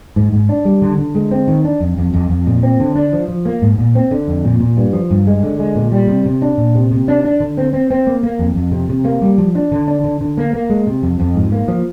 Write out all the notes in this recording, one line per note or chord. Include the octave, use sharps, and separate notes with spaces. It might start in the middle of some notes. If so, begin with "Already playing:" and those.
G#2
G#2
D4
G3
D3
D3
G#3
C4
D#3
D4
F2
F2
F2
F2
A#2
C4
D3
D4
F3
F3
A#3
G#2
A#2
C4
D3
F2
A#2
A#2
G2
F3
G2
G#3
D3
G#3
A#2
G3
C3
C3
D4
A#2
C3
C3
D4
D4
D3
C4
C4
C4
A#3
A#3
F2
F2
C3
C3
A#3
G3
F3
D4
D3
D4
D3
D3
A#3
A#3
G#3
C3
F2
F2
G#2
A#3
F3